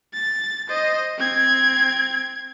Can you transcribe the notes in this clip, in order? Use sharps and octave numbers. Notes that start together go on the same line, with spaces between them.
A6
C5 D#5
C4 G#6